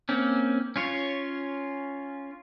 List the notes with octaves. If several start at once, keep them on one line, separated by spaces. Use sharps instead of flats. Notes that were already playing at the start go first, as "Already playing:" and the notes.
A#3 C4 C#4
C#4 F4 C#5